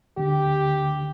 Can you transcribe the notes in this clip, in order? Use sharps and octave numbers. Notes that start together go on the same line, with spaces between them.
D2 D3 G4